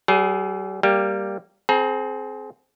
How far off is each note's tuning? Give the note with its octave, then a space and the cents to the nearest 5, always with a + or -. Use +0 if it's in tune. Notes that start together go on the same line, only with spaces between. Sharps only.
G3 -45 G#4 +15 B4 -20
G3 +0 A#3 -5 G4 +0
C4 +0 G#4 +35 A#5 +20